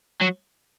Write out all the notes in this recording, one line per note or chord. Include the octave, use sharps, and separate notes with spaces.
F#3